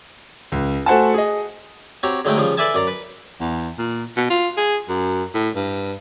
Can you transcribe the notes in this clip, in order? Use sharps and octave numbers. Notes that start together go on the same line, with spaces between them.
C#2
A3 F#4 C5 F#5 G#5 A5
G#4 D#5
C4 F#4 G4 C#5 A#5
D3 F#3 G#3 A3 D#4 G5
C#3 F3 G3
A4 B4 D5 E5 G#5 A5
F#2 D5 A#5
B4
E2
A#2
B2
F4
G#4
F#2
A2
G2